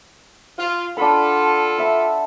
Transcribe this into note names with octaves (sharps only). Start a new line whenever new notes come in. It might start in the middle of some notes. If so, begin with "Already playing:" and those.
F4
D4 F4 A4 F#5 B5
E5 B5